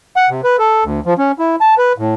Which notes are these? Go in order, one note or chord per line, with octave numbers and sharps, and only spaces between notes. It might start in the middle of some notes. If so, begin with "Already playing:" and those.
F#5
C3
B4
A4
D2
F3
C#4
E4
A5
B4
A2